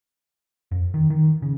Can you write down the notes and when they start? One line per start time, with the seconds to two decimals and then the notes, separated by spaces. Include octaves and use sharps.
0.72 F2
0.94 D#3
1.10 D#3
1.42 C#3